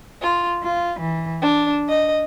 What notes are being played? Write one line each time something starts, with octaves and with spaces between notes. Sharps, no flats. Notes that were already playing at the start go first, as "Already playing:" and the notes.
F4
F4
E3
D4
D#5